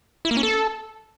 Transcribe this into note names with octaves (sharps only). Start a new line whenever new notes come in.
E4
A#3
C#4
A4